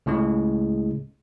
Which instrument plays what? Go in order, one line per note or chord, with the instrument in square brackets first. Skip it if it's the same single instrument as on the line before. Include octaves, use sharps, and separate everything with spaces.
[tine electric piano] C#2 A2 C#3 G#3